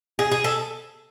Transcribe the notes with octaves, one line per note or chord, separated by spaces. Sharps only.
G#4
G#4
A4